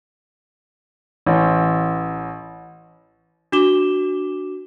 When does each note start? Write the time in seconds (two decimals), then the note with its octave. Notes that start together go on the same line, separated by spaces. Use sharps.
1.27 A1
3.52 D4 F#4 D6 E7 G7